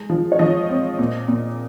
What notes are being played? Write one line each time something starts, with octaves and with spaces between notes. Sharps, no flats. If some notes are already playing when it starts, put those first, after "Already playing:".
Already playing: G#3
F3
C#5
F3 D#5
C4
A#2
A#2